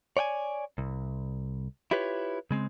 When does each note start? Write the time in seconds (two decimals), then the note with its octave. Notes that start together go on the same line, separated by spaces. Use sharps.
0.17 C#5 D5 G5 G#5
0.78 C2
1.91 E4 F4 G4 B4 C#5
2.51 C#3 G#3 C4